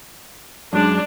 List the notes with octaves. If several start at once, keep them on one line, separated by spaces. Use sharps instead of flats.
F#2 G#3 D4